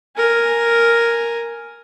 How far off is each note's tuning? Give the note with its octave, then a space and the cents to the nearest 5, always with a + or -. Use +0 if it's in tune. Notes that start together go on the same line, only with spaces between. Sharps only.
A#4 +0 G#5 +0